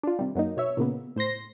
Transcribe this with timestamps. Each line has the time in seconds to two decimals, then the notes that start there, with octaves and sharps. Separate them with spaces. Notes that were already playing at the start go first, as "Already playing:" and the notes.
0.03 D4 F4
0.19 C3 D#3 G3
0.35 F#2 F#3 A#3 D#4
0.57 B2 C#5 E5
0.77 A#2 C#3 A#3 B3
1.16 A2 C5 C6 A#6